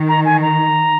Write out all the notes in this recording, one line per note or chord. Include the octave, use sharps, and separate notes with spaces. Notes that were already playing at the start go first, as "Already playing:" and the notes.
Already playing: D#3
A#5
G#5
A#5